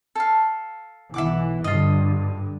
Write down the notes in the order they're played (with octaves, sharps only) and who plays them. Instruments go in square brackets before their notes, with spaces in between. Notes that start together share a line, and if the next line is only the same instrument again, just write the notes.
[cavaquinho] A4 F5
[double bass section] B1 E3 [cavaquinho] E5 F#5 D6
[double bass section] G2 D3 [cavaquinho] F4 D#5